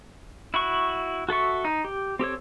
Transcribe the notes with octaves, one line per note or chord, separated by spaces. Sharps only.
E4 F#4 C#6
F#4 A4 E5 C#6
D#4
G4
C4 G4 A4 C#5